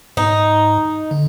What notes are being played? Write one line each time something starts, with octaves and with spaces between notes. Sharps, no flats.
G#2 D#4
D3